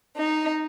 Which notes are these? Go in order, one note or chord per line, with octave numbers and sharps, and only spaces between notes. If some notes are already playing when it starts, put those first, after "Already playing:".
D#4